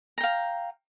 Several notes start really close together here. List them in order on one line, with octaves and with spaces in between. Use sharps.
A#5 G5 F5